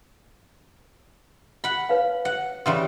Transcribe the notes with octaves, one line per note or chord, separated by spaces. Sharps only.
F#5 B5
B4 C#5 F5
F#5
C#3 E3 G3 F#5 C6 E6